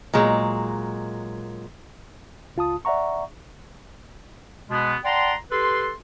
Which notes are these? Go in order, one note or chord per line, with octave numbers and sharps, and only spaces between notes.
A#2 F#3 G#3
C#2 F4 A5 D#6
D5 E5 F#5 A#5 C#6
B2 G#3 B3
D5 F#5 G5 A5 A#5 C6
G4 A4 B4 C6